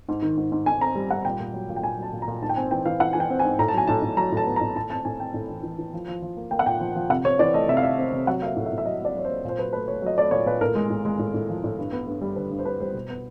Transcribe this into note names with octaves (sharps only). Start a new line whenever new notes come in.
G#2
D#3
G#2
G#2
G#2 G#5
C4 A#5
G3
G3 F#5
A#2 G5
A#2
F#3
A#2
G5
A#2 G#5
F#3 A5
A#2
A#5
A#2
G#2 A5
G5
C4 G#5
E3 G5
E3 F5
E3 F#5
E3 G#5
G5
C4
G#5
G#2
A2 A#5
A5
F#3 G#5
A2 A5
A2
F#3 A#5
A2 A5
B3
A#5
A2
A2 A5
C4 A5
A2 G#5
C4 G5
A2
E3
E3
E3
F3
F3
F3
A#3
A#3 G5
F#5
A#2 G5
F3
F3
C3 F#5
C4 C#5
E3 D5
A3 D#5
C3 E5
F5
A3 E5
C4
C3
F#3 F#5
A#3 E5 F5
A2
E5
A2
E5
F#3 D#5
A#3 D5
F#3 C#5
C5
A#3
A#2 C5
F#3 B4
A3 B4
A3 C#5
F#3 D#5
A3 D5
A#2 C#5
A#2 B4
A2 A#4
G#3
A2
G#3
A2
A2
F3
A2
G2
B3
G2
G3
D3 B4
G2
C5
G2 B4
G3 C5
B2
B3